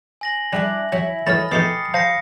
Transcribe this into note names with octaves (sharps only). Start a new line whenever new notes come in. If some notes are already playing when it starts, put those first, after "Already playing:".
G#5 A#6 F#7
G3 D4 E4 D5
F#3 E4
E3 F#3 A3 D#5 B5 F6 A6
B2 A3 D#4 G4 D#5 D#6 C7 C#7
C5 F5 A5 A#6 C#7